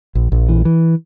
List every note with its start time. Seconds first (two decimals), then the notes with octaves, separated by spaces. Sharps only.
0.15 A#1
0.32 A#1
0.49 E3
0.65 E3